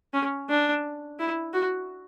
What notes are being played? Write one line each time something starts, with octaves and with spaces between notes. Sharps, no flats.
C#4
D4
E4
F#4